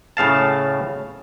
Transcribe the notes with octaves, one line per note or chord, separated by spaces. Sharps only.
A2 C#3 F5 A5